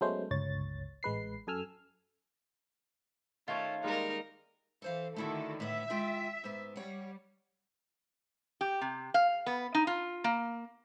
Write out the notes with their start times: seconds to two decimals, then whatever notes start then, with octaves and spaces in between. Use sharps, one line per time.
0.01 F#3 G#3 A3 B3 C#4 C5
0.31 G1 C#2 C#5 A6
1.03 A1 G#3 B4 C7
1.47 F#2 A4 G#5 E6 F6
3.48 D#3 A3 C#4 F4 C#5
3.83 G3 G#3 A#3 D#4 A#4
4.82 E3 A4 C5 F5
5.16 D3 D#3 A3 E4 F#4 A4
5.60 A2 B3 E5
5.90 G#3 F4 G5
6.44 G#2 B3
6.76 G3 C#5 F#5
8.61 G4
8.81 C3
9.14 F5
9.46 B3
9.75 D#4
9.87 F4
10.24 A#3